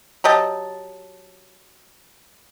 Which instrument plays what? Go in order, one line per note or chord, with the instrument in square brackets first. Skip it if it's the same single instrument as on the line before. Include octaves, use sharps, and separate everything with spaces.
[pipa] F#3 G4 D#5 A5